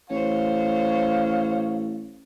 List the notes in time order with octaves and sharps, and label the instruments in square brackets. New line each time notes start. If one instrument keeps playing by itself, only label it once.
[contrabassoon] A1 [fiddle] C5 C#5 [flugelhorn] F5